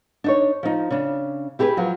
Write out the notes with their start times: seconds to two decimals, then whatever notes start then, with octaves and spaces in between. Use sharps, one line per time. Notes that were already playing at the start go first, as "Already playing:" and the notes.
0.24 D4 D#4 C#5
0.63 F3 D#4
0.90 C#3 D4
1.59 E4 G4 G#4 A#4 B4
1.77 F3 F#3